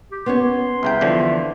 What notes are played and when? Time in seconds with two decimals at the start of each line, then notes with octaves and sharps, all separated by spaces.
0.12 G4
0.26 B3 C#4 C#5 C6
0.83 C2 C#3 E5 G5
1.01 E2 D3 F3